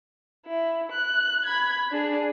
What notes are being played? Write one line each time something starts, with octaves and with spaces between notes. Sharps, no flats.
E4
F#6
B5 G#6
D4 G#4